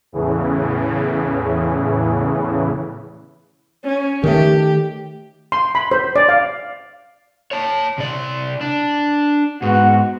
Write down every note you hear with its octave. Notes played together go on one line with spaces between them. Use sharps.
E2 A2 C#3 E3
C#4
D#3 A3 G4
C6
B5
C5
D5
F5
C#5 A5
C3 D5
D4
G#2 B3 F#4